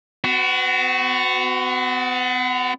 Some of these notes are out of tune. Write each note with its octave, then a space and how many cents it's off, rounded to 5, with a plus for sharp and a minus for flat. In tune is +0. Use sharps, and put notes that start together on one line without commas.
B3 +45 F#4 +0